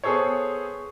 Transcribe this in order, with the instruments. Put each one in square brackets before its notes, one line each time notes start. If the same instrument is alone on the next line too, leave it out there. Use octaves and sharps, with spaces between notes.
[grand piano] B3 G#4 A4 C5 C#5